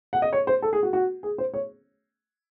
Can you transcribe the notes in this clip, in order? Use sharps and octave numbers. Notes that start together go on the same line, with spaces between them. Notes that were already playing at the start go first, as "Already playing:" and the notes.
F#5
D#5
C#5
C5
A4
G#4
F#4
F#4
G#4
C5
C#5